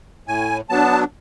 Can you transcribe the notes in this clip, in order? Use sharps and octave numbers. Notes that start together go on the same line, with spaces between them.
A2 G#5
F#3 B3 D4 A5